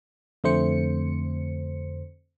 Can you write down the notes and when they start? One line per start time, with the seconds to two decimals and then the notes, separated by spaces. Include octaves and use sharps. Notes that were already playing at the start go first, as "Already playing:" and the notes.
0.44 F2 D3 A3 C4 C5 C#7